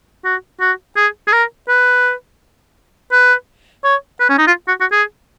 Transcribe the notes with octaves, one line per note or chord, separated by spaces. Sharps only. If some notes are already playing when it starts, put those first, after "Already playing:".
F#4
F#4
G#4
G#4
A#4
B4
B4
C#5
B4
C#4
D#4
F4
F#4
F#4
G#4